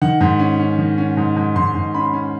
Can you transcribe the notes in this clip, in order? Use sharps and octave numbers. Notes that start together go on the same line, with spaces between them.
D#3 F#5
G#2
C#4
C#4
D#3
C#4
G#2
G#2
G#2 C6
G#2
C#4 B5
C#4